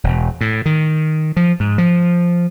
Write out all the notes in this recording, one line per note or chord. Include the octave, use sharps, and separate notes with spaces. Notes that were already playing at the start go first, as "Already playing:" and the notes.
E1
A2
D#3
F3
G#2
F3